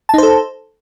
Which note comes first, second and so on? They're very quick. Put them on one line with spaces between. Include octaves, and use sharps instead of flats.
A5 D#4 C5 A4